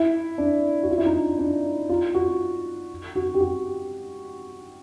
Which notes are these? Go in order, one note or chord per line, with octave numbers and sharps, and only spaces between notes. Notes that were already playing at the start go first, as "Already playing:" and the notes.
Already playing: E4
D4
F#4
F4
E4
D#4
D4
D4
F4
F#4
F#4
G4
F#4